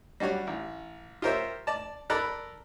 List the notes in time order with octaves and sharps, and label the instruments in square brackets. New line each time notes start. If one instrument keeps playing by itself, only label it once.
[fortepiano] G3 D4 F#4 C#5
A1
F4 G4 A#4 C5 C#5 E5
D5 A5
A4 A#4 D5 A#5 B5 F#6